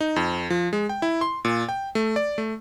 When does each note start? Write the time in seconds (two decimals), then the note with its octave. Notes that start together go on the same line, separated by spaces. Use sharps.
0.01 D#4
0.16 F2
0.50 F3
0.73 G#3
0.89 G5
1.02 E4
1.21 C6
1.45 A#2
1.69 G5
1.95 A3
2.16 D5
2.38 A3